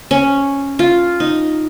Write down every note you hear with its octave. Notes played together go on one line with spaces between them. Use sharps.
C#4
F4
D#4